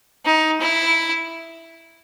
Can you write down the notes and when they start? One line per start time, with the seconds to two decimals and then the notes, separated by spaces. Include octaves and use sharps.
0.25 D#4
0.61 E4